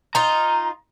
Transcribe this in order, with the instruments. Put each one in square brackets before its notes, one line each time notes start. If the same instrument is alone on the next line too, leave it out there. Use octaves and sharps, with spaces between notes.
[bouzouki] D#4 F4 [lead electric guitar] A#5